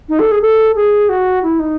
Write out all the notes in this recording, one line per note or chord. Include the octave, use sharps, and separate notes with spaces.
D#4
A4
G#4
A4
G#4
F#4
E4
D#4